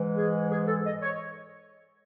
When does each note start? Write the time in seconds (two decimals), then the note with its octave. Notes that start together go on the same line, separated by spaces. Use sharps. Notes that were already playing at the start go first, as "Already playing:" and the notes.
Already playing: G#2 E3 G#3
0.17 G#4
0.51 G#4
0.67 A4
0.85 D#5
1.02 C#5